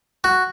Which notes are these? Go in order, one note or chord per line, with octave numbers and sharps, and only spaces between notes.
F#4